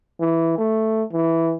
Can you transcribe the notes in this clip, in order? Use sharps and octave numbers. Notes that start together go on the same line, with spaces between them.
E3
A3
E3